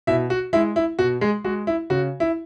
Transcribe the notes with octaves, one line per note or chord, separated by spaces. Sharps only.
B2 E4 E5
F#4
G#3 E4
E4
B2 F#4
G#3 G#4
G#3 F#4
E4
C#3 F#4
E4